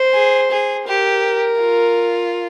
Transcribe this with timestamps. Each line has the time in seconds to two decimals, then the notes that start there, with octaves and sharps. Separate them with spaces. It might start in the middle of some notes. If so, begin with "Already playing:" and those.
Already playing: C5
0.14 G#4
0.51 G#4
0.87 G4 A#4
1.61 F4